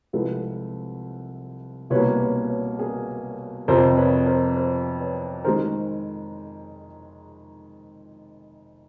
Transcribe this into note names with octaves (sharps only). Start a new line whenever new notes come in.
C2 C3 F3 G#3 A4 B4
C2 B2 G3 A#3 B4 C#5
B4 C#5
B4 C#5
G#4 A#4
F2 C3 F3 A#4 C5
B4 C#5
A#4 C5
A#4 C5
B4 C#5
D#3 G#3 A#4 C5